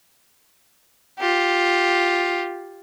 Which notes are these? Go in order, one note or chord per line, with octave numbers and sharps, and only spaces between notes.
F4 G4